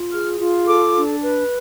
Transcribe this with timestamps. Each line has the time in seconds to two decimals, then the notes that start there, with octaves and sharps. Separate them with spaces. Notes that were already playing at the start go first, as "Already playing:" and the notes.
Already playing: F4
0.12 G#4 F6
0.40 F4
0.67 A4 D6
0.95 D4
1.21 B4